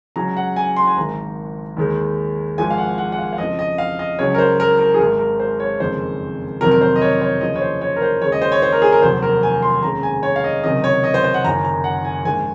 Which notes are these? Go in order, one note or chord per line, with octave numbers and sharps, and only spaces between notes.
C#2 C#3 F#3 A#5
F#5
G#5
C6
G#5
G#1 G#2 D#3 A#5
D#2 D#3 G#3
G#1 G#2 F3 G#3 G#5
F5
F#5
F#5
F#5
F5
F5
F2 C#3 F3 D#5
D#5
F5
D#5
C#2 C#3 F#3 C#5
A#4
C5
A#4
A#4
G#4
G#1 G#2 D#3 G#3 A#4
A#4
C5
C#5
F#1 F2 D#3 G#3 C5
F2 C3 D#3 F#3 A#4
A#4
C5
D#5
C#5
C#5
D#2 C#3 F3 D#5
C#5
C5
C#5
A#4
C5
D#2 C#3 G#3 C#5
D#5
C5
C#5
C5
A#4
G#4
A#4
F1 D#2 D#3 F#3 C5
A#4
G#5
C6
F1 D#2 C#3 G#3 A#5
G#5
C#5
F5
D#5
C#2 C3 D#3 F#3 D#5
C#5
D#5
C5
C5
F#5
F#1 F#2 D#3 A#5
A#5
F#5
G#5
A#1 G#2 D#3 G#5